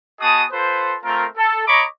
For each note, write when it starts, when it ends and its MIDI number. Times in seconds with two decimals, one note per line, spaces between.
0.21 0.44 59
0.21 0.44 66
0.21 0.44 68
0.21 0.44 75
0.21 0.44 81
0.21 0.44 87
0.52 0.96 65
0.52 0.96 69
0.52 0.96 71
0.52 0.96 72
1.03 1.25 57
1.03 1.25 60
1.03 1.25 65
1.03 1.25 70
1.37 1.65 69
1.67 1.85 73
1.67 1.85 75
1.67 1.85 82
1.67 1.85 83
1.67 1.85 85
1.67 1.85 86